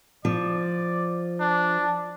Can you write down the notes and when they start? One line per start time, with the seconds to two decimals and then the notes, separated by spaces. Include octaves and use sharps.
0.25 F3 D5
1.40 D4